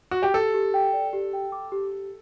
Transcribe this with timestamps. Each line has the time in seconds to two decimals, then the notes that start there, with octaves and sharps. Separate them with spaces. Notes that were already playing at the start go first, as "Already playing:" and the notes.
0.11 F#4
0.23 G4
0.34 G4 A4
0.54 G4
0.74 G5
0.93 D5
1.13 G4
1.33 G5
1.52 D6
1.72 G4
1.92 G4